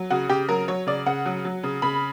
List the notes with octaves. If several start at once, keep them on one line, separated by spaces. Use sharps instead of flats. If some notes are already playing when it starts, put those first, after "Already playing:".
Already playing: F#3
C#3 F#4
C#3 G4
F#3 A#4
F#3 C#5
C#3 D5
C#3 F#5
F#3
F#3
C#3
C#3 B5